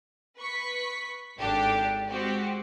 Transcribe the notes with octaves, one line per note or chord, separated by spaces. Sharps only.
B4 C#6 B6
G#1 D4 G4 A4
G#3 C4 F#4 G4